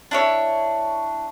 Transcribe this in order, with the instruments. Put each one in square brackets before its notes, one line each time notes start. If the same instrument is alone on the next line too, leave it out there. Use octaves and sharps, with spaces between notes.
[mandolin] D4 E4 C#5